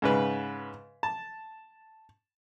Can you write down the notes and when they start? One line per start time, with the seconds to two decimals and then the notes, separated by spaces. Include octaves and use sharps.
0.02 G#2 C#3 B4
1.03 A5